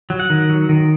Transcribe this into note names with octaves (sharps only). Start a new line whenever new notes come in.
F#3
F#5
D#3
F#3
D#3